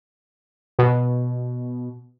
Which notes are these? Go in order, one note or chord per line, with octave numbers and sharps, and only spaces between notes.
B2